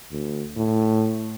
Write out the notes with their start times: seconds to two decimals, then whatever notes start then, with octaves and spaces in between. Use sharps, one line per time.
0.11 D2
0.57 A2